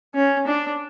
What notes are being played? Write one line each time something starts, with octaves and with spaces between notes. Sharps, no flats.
C#4
D4